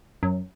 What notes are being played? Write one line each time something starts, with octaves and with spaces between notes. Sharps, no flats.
F#2